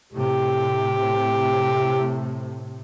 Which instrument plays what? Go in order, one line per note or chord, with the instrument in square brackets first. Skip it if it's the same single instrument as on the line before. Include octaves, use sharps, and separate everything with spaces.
[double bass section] A2 C3 [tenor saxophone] G4